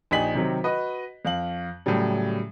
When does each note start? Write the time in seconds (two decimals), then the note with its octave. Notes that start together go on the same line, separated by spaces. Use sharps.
0.11 A#1 D#4 G4 G#5 B6 F#7
0.35 C3 D#3 F#3 C4 G4
0.64 F#4 B4 D#5
1.25 F2 F5 F#7
1.86 A2 C#3 F#3 G3